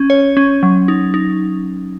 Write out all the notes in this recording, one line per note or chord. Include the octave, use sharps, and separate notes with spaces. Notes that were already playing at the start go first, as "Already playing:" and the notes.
Already playing: C#4
C#5
C#4
F#3
D#4
D#4